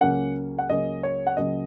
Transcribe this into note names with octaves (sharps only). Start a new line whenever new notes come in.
C#2 C#3 F#3 A#3 C#4 F#5
F#5
C#2 C#3 F#3 A#3 C#4 D#5
C#5
F#5
C#2 C#3 F#3 A#3 C#4 D#5